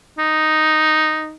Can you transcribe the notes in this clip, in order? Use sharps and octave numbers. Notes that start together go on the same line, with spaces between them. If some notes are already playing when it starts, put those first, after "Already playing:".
D#4